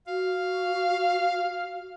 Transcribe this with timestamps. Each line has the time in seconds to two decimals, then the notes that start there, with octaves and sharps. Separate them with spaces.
0.07 F#4 F5